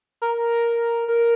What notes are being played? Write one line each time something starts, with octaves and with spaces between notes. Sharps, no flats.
A#4
A#4